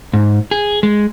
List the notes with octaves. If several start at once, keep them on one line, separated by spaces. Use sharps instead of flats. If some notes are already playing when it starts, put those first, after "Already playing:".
G#2
G#4
G#3